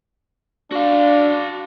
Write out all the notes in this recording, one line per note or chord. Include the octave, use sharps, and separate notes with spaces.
D4 F#4 F5